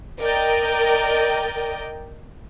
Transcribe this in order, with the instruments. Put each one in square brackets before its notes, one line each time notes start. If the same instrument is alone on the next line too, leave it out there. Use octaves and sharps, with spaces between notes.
[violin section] A#4 D5 D#5 G5